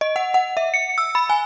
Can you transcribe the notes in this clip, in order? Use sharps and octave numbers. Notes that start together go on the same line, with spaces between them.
D#5
F#5
F#5
E5
C#7
E6
B5
G#5